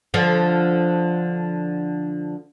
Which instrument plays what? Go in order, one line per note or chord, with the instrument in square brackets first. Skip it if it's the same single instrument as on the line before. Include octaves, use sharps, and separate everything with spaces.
[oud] D3 F3